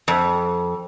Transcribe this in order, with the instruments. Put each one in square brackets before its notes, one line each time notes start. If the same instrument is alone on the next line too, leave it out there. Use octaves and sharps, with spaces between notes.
[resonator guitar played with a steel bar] F2